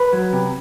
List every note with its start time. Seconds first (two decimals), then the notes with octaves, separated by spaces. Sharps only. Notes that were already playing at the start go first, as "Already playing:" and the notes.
Already playing: B4
0.13 F#3
0.33 C3